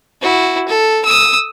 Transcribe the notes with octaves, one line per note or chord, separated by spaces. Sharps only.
E4 F#4
A4
D#6 E6